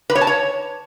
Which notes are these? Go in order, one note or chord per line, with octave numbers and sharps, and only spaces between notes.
B4
C#5
A5
C#5